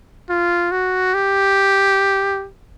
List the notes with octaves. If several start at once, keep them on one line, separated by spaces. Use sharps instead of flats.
F4
F#4
G4